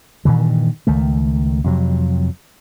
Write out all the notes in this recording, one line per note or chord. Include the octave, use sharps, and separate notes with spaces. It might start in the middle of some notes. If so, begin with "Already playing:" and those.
G2 A#2 D#3 E3
C#2 D#3 A3
F2 C3 F#3